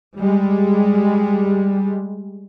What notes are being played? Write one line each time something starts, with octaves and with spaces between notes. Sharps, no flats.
G3 G#3